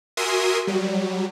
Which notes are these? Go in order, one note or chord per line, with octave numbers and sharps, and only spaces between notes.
F#4 A#4 E5 G#5 C6 D#6
F#3 G3